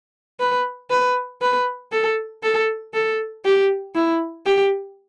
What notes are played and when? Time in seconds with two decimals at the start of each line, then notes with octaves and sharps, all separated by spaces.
0.40 B4
0.90 B4
1.41 B4
1.92 A4
2.43 A4
2.94 A4
3.45 G4
3.95 E4
4.46 G4